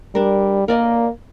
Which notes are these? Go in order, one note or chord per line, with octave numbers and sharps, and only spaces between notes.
G3 D4 A#4
A#3 A#4 D5 D#5